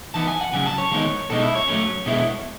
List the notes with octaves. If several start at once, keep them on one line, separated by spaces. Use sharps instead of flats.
E3 B3 D#4 A5
G#5
F#5
C#3 F#3 C#4 G#5
A5
C#5
D#3 G#3 B3 D#4
B2 G#3 D#4 A4
E4
C#5
F#3 A3 C#4
B2 G#3 B3 E4